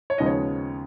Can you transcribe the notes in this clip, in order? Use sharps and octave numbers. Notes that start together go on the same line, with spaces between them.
C#5
D#2 C#3 F3 G#3 B3 D#5
C#5